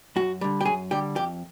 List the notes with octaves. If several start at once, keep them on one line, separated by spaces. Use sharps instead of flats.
F#2 F#4
D3 G3
G4
F#2 G#4
D3 G3 G4
F2 G4